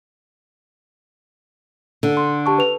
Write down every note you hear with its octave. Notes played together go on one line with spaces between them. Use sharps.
D3
C6
G4 A5 C#6
B4 F7